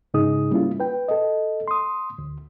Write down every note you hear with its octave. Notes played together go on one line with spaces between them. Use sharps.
G#2 C#3 D#4 G#4 D#6
G3 A#3 C#4 E4 F4
B4 G5
A4 D#5
C6 D#6
D2